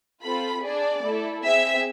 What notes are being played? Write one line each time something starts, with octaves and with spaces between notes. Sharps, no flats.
C4 F4 A4 B5
D4 G#4 D5
A3 E4 A4
C4 G#4 E5